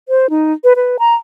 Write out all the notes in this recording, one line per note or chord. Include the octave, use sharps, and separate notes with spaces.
C5
D#4
B4
B4
A#5